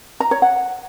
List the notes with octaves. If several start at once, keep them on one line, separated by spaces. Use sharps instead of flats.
A#5
C#5
F#5